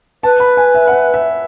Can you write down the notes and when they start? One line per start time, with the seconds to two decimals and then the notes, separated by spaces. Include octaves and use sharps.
0.23 B4 A5
0.40 B5
0.57 G#5
0.75 E5
0.87 F#5
0.92 E5
1.14 E5